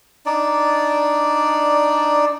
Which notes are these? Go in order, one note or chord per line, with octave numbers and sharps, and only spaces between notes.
D4 D#4 D5